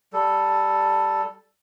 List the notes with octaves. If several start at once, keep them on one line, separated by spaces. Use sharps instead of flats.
G3 A4